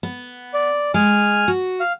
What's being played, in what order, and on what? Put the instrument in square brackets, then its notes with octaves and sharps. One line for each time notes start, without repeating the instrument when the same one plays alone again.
[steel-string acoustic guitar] B3
[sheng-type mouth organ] D5
[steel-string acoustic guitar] G#3 [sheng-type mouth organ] G#5 F6
[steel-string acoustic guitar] F#4
[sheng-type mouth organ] F5